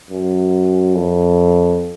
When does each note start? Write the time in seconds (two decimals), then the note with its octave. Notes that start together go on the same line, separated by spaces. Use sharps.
0.11 F#2
0.95 F2